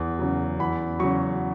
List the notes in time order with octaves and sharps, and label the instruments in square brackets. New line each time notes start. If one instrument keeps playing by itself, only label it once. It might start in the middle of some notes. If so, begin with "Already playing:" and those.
Already playing: [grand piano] E2
C#3 F#3
E2 B5
C#3 F#3 C#6